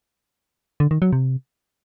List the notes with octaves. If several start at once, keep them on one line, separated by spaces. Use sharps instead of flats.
D3
D#3
F#3
C3